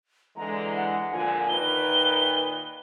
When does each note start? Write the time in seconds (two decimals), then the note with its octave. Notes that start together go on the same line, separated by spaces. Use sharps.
0.37 D3 E3 G#3 A#5
0.76 F#5
1.12 A#2 D3 F3 G#5
1.49 A#2 D#3 B4 G7